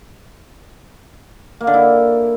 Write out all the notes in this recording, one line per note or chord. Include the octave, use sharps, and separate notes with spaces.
A#3
D3
E4